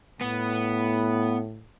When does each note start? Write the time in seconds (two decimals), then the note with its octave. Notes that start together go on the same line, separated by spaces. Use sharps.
0.21 A2 B3